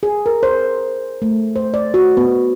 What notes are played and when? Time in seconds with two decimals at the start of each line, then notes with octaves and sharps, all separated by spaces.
0.03 G#4
0.26 A#4
0.43 C5
1.22 A3
1.56 C5
1.74 D5
1.94 F#4
2.17 B3